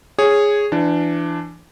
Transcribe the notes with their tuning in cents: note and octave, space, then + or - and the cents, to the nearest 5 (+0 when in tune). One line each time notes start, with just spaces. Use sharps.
G#4 -5 C#5 +0
E3 +30 D4 +5